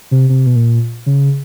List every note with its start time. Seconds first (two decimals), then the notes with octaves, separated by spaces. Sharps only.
0.11 C3
0.30 C3
0.46 B2
0.56 A#2
1.06 C#3